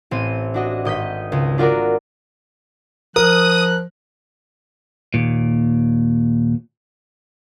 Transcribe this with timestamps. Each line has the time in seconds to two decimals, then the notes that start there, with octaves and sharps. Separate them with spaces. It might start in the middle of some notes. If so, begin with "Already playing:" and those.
0.11 A1 C4 D#7
0.54 D4 F#4 D#5
0.85 G#1 D#5 G6 B6
1.32 C#2
1.58 D4 F4 F#4 A#4 D5
3.16 F3 A#4 D#6 F#6
5.14 D#2 A#2